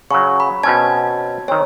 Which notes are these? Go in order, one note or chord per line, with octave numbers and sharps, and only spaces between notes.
C#3 F#3 C#6
B5
B2 C4 C#4 A5 G#6
D#3 C4 C#5